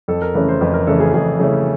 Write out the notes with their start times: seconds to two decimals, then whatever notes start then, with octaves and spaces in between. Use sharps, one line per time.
0.08 F2 A4
0.22 A#4
0.34 C#3 E3 A3 C#4 B4
0.48 C5
0.61 F2 B4
0.74 A#4
0.87 C#3 E3 A3 C#4 A4
1.00 G#4
1.14 F2 G#4
1.40 C#3 E3 A3 C#4